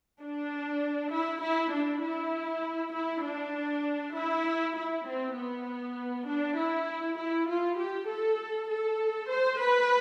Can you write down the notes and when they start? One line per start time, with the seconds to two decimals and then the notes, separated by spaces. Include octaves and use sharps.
0.21 D4
1.12 E4
1.41 E4
1.72 D4
2.03 E4
2.93 E4
3.24 D4
4.14 E4
4.76 E4
5.06 C4
5.35 B3
6.26 D4
6.56 E4
7.17 E4
7.47 F4
7.77 G4
8.07 A4
8.69 A4
9.29 C5
9.60 B4